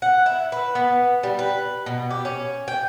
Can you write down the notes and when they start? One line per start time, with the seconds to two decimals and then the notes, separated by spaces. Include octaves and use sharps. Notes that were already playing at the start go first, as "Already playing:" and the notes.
0.02 F#5
0.26 E4
0.52 B4
0.75 B3
1.23 G3
1.39 B4
1.86 B2
2.10 G4
2.25 C#4
2.68 G5